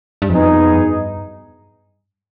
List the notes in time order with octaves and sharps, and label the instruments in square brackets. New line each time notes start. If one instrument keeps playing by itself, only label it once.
[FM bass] G2
[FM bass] F2 [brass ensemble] B2 B3 D#4 G#4
[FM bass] G2